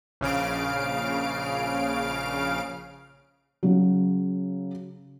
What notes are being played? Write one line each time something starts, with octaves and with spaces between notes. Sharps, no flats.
A#1 C#3 F5 D7
C#3 F#3